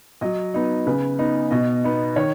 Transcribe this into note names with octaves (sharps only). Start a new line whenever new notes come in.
F#3 D#5
B3 D#4
C#3 B4
B3 D#4
B2 D#5
B3 D#4
D#3 C#5